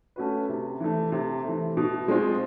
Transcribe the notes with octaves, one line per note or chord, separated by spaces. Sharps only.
A3 C#4 F#4 B4
C3
E3 A3
C3
E3 A3
B2
G#3 C4 F4